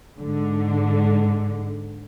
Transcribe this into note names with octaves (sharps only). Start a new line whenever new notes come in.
G#2 D3